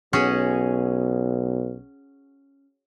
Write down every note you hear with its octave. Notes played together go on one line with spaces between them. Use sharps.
B1 C#4 F#4 G#4